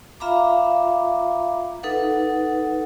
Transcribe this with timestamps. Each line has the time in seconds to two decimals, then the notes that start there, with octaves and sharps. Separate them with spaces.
0.20 F4 E5 F5 A#5 B5 D6
1.83 D#4 A4 B4 F#5